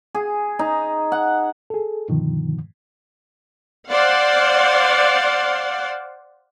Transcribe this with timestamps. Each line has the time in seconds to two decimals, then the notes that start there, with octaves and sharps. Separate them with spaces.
0.15 G#4
0.59 D#4
1.12 F#5
1.70 G#4 A4
2.09 G2 B2 D3 D#3 F3
3.89 C5 D5 F5 F#5